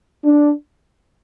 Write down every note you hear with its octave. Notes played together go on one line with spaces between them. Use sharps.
D4